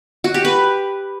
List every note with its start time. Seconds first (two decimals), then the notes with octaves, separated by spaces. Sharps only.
0.24 F#4
0.34 G4
0.45 B4